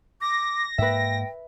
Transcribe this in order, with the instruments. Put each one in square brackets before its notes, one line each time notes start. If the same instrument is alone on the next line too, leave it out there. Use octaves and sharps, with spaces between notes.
[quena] D6 [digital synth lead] A#6
[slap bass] G#2 A#3 [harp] B4 E5 [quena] G5